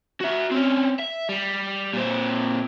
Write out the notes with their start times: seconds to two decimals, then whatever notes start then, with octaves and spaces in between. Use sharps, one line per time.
0.20 F#4 E5
0.51 C4 C#4
1.00 E5
1.29 G3
1.94 A#2 C4